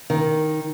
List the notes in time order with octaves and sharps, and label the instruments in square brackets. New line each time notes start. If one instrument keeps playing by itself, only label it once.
[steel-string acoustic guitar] D#3